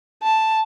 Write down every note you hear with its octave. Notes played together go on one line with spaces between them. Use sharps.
A5